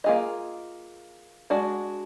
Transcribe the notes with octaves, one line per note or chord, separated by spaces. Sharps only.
A#3 F4 G#4 D#5
G#3 D4 F#4 D5